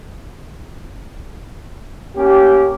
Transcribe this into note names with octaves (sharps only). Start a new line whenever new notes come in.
A#3 C#4 G4